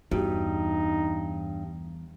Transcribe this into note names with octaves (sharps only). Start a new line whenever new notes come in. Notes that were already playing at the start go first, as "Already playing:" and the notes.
E2 G2 D#4 F#4 G4